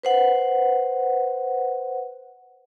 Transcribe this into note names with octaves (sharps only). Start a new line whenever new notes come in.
B4 C5 F#5